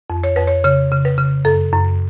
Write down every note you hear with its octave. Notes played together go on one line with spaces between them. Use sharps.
F2
C#5
F2 B4
C#5
C#3 C#5
C#3
B4
C#3
F#2 A4
F#2